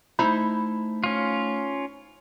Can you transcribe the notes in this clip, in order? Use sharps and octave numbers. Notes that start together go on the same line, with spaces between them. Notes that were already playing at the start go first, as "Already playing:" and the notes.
A3 D#4 E4 C5 B5
C#4 F4